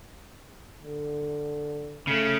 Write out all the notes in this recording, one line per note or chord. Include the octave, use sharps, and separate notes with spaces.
D3
C#3 A3